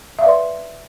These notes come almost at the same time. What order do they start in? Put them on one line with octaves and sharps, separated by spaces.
E5 F5 D5 B4 C6